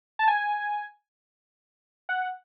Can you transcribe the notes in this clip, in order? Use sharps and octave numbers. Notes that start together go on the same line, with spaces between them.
A5
G#5
F#5